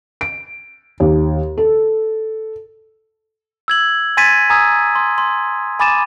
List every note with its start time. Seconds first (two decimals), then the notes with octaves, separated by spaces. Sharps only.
0.21 D7
1.00 D#2
1.58 A4
3.68 E6 G#6 F#7
4.17 G#5 C6 G#6 A6 B6 D#7
4.50 G#5 A#5 D#6 E6 G#6
4.95 C6
5.18 C6
5.79 G#5 B5 D6 A6 D#7 E7